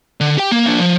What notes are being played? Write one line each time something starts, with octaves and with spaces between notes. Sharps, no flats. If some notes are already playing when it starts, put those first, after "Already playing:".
D3
G4 G5
A#3
A#3 D4
F3